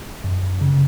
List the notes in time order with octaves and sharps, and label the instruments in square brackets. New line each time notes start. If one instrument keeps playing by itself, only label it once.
[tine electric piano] F#2
C#3